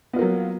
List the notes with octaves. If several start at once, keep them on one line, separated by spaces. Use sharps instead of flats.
F#3 A#3 B3 F4